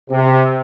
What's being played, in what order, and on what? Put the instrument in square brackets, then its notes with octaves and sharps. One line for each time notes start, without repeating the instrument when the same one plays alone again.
[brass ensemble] C3